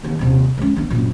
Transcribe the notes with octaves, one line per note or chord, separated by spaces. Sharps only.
D#2 E3
D#1 C3
G#3 C#4
B3 D4
F#1 A#2